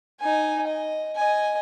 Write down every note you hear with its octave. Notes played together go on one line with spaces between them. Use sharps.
D#4 G#5
D#5
D#5 G#5